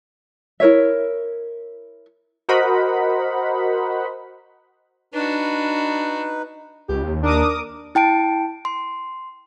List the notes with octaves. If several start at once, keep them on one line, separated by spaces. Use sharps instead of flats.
E4 A#4 C#5 E5
F#4 A#4 C5 D#5 F#5 B5
D4 D#4 F#4 B4
C#2 G4
D#2
D4 A#4 D6 D#6
E4 G5 A5 D7
C6